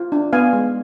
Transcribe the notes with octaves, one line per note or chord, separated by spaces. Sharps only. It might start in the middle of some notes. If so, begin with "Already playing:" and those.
Already playing: F4
D4
B3 F5 G#5
G#3